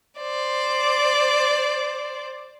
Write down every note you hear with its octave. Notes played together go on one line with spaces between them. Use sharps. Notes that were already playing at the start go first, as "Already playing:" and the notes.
C5 D5